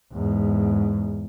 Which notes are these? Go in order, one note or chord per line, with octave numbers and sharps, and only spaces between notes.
E2 G#2